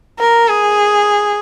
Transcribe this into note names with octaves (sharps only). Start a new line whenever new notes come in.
A#4
G#4